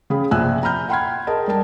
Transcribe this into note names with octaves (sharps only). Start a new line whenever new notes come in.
C#3 G#4 G5 B5
A#1 C3 G#5 E6 F#6
A#5 B5 F6 G6
F#5 G5 B5 C6 F6 G#6
G#4 A#4 D#5 A5
G3 A#4 A5